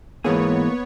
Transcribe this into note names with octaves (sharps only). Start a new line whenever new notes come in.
G#2 E3 A#3 B3 G#4 C#5